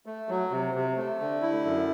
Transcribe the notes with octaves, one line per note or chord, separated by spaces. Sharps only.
A3
F#3
C3
C3
A3
D3
E4
F#2